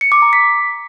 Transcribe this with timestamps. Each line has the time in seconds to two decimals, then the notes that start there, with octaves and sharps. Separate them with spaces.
0.01 C#7
0.12 D6
0.22 A#5
0.33 B6